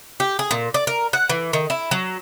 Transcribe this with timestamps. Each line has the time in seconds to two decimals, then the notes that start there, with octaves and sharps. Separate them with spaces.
0.20 G4
0.39 G#4
0.51 A#2
0.74 D5
0.87 A#4
1.13 F#5
1.30 E3
1.53 D#3
1.70 E4
1.91 F#3